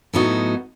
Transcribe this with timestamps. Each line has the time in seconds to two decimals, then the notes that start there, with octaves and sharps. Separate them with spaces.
0.13 A2 F#3 B3 D#4 F#4